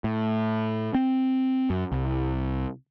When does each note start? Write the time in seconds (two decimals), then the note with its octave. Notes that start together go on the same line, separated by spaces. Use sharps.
0.04 A2
0.95 C4
1.70 F#2
1.92 C2